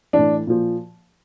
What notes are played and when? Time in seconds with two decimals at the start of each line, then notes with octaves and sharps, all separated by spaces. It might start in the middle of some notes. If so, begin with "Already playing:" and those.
0.13 A2 E3 D4
0.47 A#2 F3